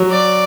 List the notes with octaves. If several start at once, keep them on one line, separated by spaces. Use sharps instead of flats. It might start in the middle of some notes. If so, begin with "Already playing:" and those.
Already playing: F#3
D5